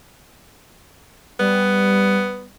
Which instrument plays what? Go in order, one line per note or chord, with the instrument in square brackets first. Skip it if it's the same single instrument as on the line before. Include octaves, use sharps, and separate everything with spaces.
[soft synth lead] G3 [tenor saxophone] B3